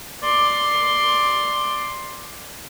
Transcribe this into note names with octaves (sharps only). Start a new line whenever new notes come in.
D5 C6